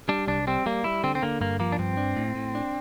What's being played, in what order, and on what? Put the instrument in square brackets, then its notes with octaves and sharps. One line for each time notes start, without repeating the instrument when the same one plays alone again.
[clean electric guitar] G3 [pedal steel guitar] D4
[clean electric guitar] C2 [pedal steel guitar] D4
[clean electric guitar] G3 [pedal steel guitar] C4
[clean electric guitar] G3 [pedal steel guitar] A#3
[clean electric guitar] G3 [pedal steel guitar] E4
[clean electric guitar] D3 [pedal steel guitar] C4
[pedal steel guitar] C4
[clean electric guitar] D3 [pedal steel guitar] A#3
[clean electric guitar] G2 [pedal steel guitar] A#3
[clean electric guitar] F3 [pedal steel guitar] A#3
[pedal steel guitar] D4
[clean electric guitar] G2 [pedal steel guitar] C4
[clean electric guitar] D4
A2
A2
D4